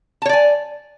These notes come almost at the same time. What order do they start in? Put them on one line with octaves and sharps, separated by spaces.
A5 C#5 D5 G#5